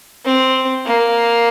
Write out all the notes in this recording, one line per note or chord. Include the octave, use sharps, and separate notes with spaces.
C4
A#3